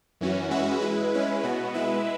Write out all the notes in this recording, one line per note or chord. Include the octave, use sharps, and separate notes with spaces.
F#2 E3 C#4 F#4
G#3 C#4 F#4 B4 E5
G#3 E4 B4
G#3 C#4 E4 B4
B2 B3 F#4
G#3 E4 B4 E5